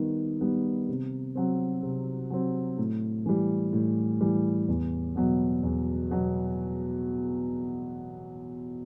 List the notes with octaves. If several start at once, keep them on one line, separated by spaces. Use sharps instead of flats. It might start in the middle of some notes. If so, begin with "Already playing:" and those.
Already playing: D#3 G3 B3
G3 B3
C3
F#3 C4
C3
F#3 C4
A2
E3 G3
A2
E3 G3
E2
B2 F#3 B3
E2
B2 F#3 B3